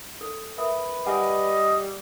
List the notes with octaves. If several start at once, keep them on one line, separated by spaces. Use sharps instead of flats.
A4
A#4 B4 E5 D#6
G3 D5 D#5 F#5 G#5